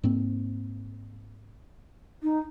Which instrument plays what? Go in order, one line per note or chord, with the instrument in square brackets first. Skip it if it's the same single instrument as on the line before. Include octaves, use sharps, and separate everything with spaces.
[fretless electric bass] G#2 A#3 C4
[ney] D#4